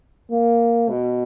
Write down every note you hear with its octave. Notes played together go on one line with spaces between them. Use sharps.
A#3
B2